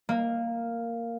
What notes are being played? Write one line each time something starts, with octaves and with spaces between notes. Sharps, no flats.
A#3